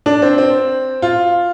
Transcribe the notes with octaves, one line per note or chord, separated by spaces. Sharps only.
D4
C4
C4
F4